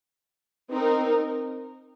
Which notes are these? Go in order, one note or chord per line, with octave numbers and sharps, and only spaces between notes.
C4 D#4 A#4